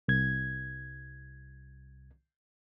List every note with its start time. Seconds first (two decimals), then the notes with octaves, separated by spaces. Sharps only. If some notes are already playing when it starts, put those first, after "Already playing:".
0.08 C2 G#6